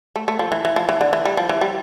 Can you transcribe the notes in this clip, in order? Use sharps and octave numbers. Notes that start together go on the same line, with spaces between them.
A3
A3
F3
E3
E3
F3
E3
D3
E3
G3
F3
E3
G3